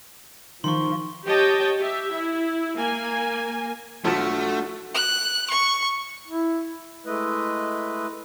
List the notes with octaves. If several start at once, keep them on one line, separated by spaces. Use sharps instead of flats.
D#3 F3 C6 C#6
G4 C#5 D#5 G5 A5
G4 E5
E4
A#3 G#5
B1 F3 A3 D4 F4 F#4 A4 A5
F#6
C#6
E4
G#3 A3 E4 B4 D#5